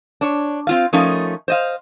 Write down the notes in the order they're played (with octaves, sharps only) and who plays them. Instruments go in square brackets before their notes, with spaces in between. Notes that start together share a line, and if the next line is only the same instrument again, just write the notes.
[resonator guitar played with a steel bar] D4 C#5
C4 F4 F5
F3 A3 C#4 D#4 A#4
C5 D#5 F5